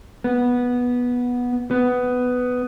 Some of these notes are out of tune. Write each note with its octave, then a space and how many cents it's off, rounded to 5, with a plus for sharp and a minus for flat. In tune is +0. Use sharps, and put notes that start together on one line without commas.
B3 -10
B3 +10